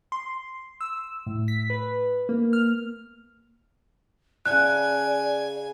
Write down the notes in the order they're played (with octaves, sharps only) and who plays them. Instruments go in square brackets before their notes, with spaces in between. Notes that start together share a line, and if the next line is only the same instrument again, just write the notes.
[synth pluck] C6
E6
A2
B6
B4
A#3
F6
[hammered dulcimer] C#3 F#5 A5 [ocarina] D5 [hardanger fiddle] G#5 [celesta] F#6